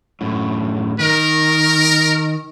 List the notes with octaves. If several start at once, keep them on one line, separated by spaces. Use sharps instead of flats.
F#2 A2
D#3 A#4